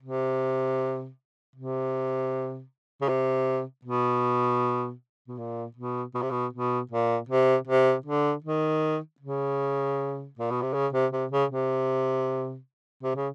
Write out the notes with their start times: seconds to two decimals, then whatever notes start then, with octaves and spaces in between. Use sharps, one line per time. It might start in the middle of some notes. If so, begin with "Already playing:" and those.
0.02 C3
1.56 C3
3.01 C#3
3.09 C3
3.85 B2
5.28 B2
5.38 A#2
5.76 B2
6.14 B2
6.22 C3
6.31 B2
6.53 B2
6.91 A#2
7.29 C3
7.67 C3
8.06 D3
8.44 D#3
9.20 C#3
10.39 A#2
10.51 B2
10.62 C3
10.74 C#3
10.93 C3
11.12 C3
11.31 C#3
11.51 C3
13.03 C3
13.16 C#3